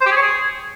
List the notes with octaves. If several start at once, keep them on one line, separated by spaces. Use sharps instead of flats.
C5
G4
G#4
C#5
G#4